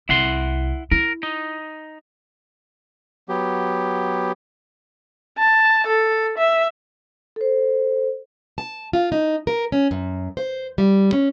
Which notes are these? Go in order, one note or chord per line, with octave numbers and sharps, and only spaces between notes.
C2 E4 F#5 C6
E4 A#4
D#4
F#3 B3 G4
A5
A4
E5
A4 C5
A5
F4
D#4
A#4
C#4
F#2
C5
G3
C#4